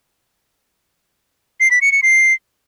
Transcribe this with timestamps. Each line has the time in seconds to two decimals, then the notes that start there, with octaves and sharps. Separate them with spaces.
1.60 C7
1.71 B6
1.82 C#7
1.92 C#7
2.03 C7